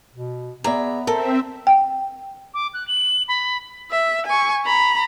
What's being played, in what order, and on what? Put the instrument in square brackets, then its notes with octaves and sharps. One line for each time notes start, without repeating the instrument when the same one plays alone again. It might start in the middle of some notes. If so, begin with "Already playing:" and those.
[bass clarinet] B2
[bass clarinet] B3 [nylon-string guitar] G#4 D5 E5 [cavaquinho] A#5
[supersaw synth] C4 E5 [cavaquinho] A4 [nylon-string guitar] A#4
[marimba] G5
[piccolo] D6
F#6
F#7
B5
[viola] E5
G#5 C#6
A#5 B5